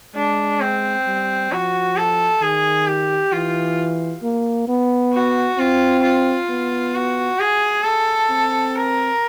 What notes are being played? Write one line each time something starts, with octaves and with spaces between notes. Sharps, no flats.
G#3 D4
C4
G3
F3 F#4
A4
D#3 G#4
G4
E3 F4
A#3
B3
F#4
C4 F4
F4
B3
F#4
G#4
A4
C4
A#4